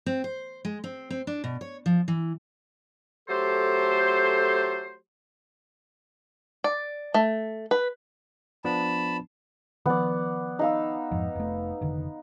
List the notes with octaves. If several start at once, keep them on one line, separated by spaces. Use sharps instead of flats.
C4
C5
G#3
C4
C4
D4
B2
C#5
F3
E3
F#3 A3 G4 A4 C5
D5
A3
B4
F3 B3 D4 A5 B5
D#3 F3 B3 D5
D#4 F5 E6
F2 G#2 F3
F1 A3
F1 D3 D#3